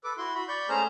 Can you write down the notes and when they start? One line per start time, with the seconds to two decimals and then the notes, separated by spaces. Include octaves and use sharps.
0.04 A4 B4 D6
0.18 E4 F#4 C6
0.35 F#4 B5
0.48 D5 B5 C#6 G6
0.69 A3 C#4 G#4 C5 A#5 F6